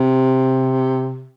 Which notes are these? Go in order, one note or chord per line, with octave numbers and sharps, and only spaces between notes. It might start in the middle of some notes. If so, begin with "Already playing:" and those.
Already playing: C3